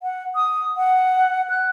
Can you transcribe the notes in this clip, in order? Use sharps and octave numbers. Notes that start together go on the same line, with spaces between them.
F#5
D#6
F#5
F#6